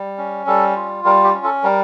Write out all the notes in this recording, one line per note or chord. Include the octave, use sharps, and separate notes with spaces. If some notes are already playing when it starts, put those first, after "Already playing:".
Already playing: G3
C#4
G3 A4
F4
G3 A#4
G4
C#4
A4
G3 A#4